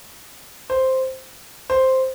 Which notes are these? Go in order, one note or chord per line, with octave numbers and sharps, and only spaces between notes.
C5
C5